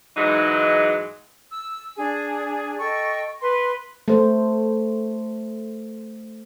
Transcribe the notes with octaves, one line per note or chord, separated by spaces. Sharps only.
G#2 E3 F#3 G#3 D#4
E6
D4 G#4 G#5
A4 D#5 G5 C#6
B4 C6
A3 C5